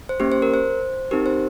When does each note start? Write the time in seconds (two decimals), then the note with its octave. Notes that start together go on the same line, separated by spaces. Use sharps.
0.09 C5
0.20 A#3 C#4 G4
0.32 C5
0.42 A#4
0.54 C5
1.11 C4 D#4 G4 A#4
1.26 C5